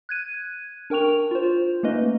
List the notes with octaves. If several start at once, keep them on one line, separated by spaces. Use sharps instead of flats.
F#6 G#6 D#7
D4 A#4 G5 C#6 F7
F4 C5
A3 A#3 C#4 D#4 B4 D#5